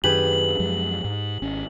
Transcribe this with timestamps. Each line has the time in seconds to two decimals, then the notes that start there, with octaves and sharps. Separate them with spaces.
0.04 F#2 D#3 D4 G4 G#4 B4 F#7
0.59 F#2 F3 G#3
1.04 G#2
1.42 G#1 C#4